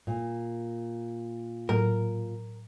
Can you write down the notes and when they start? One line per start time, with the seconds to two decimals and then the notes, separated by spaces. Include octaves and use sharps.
0.07 A#2
1.69 A2 F#3 A#4